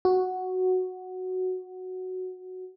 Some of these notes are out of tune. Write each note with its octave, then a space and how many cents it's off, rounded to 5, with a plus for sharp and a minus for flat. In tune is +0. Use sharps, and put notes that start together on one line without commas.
F#4 +0